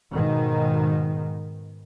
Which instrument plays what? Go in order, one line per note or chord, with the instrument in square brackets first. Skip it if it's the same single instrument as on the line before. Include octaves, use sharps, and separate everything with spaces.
[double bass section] G#2 B2 D#3